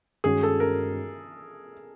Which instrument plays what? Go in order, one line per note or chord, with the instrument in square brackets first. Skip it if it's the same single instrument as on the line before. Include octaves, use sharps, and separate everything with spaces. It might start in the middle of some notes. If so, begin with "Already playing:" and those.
[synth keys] G2 D#3 G#3 C#4 F#4 [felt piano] G#4
[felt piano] A4
A#4